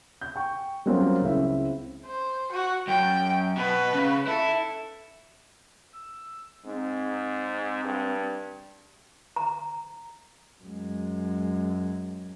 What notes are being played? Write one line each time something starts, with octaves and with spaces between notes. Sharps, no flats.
G6
G5 C#6
F#3 G3 A#3 C4 C#4 F4
C#2 C4 E4 E5
C5
F#4
F#2 G5
B2 B4
C#3
E4 A4
E6
G#2 C4
G2
A#5
F#2 G#3